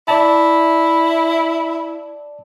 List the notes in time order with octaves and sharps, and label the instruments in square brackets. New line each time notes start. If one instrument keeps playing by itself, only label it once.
[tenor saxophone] E4 [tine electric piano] D5 A5